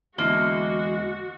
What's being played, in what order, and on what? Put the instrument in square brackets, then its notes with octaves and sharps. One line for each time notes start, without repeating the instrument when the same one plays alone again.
[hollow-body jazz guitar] E2 D3 E4 [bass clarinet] G#3 [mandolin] A#3 [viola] F#4